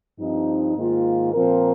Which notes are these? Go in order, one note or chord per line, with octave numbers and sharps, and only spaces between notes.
G2 F3 C4 D#4
G#2 D#3 A#3 F4
A#2 F3 C4 F4 A#4